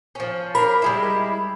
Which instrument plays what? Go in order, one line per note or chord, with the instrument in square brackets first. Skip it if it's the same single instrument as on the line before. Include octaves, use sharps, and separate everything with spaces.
[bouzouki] F3 C#4
[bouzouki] D4 A#4 [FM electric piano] B5
[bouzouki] G3 G#3 E4